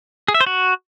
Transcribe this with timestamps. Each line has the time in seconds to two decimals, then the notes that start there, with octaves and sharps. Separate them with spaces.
0.28 G#4
0.34 E5
0.40 C5
0.47 F#4